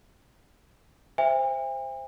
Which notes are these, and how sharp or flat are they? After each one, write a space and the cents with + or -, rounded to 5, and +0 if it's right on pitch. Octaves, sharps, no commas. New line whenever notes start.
C5 +0 E5 +10 G5 +45